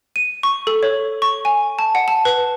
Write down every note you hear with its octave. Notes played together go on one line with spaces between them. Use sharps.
D#7
C#6
A4
C#5
C#6
G#5
A5
F#5
A5
B4